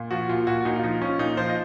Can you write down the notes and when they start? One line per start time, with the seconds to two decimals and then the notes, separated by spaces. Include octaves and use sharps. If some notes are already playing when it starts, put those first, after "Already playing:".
Already playing: A#2
0.11 F3 F#4
0.29 A#2 F4
0.47 A#2 F#4
0.65 A#2 D#4
0.76 F4
0.83 F3 D#4
1.01 F3 C#4
1.19 A#2 D#4
1.37 F3 C5
1.49 D#5